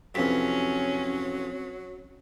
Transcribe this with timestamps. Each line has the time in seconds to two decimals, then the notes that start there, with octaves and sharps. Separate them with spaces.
0.15 F2 C3 E3 F#3 C4 C#4 B6